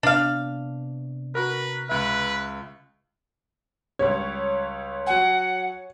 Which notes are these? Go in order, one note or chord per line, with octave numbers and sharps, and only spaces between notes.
C3 B3 D4 F5
F#4 A#4 B4
C#2 B4 E5
C#2 G3 C#5
F#3 F#5 G#5